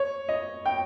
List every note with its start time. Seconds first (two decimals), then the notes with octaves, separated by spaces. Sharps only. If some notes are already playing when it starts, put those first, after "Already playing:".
Already playing: C#5
0.29 D#5
0.66 G5